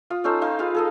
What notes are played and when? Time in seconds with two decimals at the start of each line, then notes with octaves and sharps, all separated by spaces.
0.10 F4 D#6
0.24 C#4 D#4 A4 C5
0.41 D#4 C5 F5
0.59 F4 G#4 B4 F5
0.74 G#4 A4 D#5